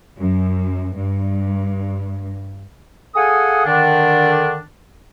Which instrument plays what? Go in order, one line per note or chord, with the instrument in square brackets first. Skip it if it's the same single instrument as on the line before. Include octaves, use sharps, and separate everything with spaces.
[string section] F#2
G2
[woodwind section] G#4 A4 F5 F#5 G#5 D#6
D3 D#3 D4